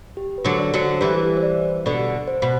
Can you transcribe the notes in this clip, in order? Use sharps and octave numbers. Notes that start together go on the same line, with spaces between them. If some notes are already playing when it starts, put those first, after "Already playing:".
G4
B4
D3 F#3
D5
D3 F#3
C5
E3 G3 B4
C5
D5
B2 D3 D5
C5
B2